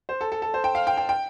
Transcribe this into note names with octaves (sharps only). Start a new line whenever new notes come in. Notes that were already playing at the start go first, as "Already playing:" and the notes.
C5
A4
A4
A4
C5
G5
F5
G5
G5
G5